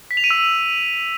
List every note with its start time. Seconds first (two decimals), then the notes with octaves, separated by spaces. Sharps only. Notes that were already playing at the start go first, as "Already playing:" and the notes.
0.11 B6
0.17 F7
0.24 D#7
0.30 E6